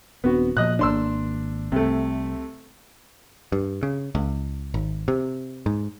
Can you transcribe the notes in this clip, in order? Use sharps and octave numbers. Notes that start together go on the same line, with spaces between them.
D#1 B3 C4 D4 F#4
A#2 F3 D#5 F#6
G#1 F#2 A#3 D4 C6 E6
C2 C3 A3
G2
C#3
C#2
G#1
C3
G#2